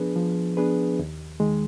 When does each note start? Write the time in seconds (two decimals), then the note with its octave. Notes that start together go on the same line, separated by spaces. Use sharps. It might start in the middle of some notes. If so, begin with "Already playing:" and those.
Already playing: F3 B3 D4 G#4 B4
0.16 F3
0.57 B3 D4 G#4 B4
0.99 D#2
1.40 D#3 G#3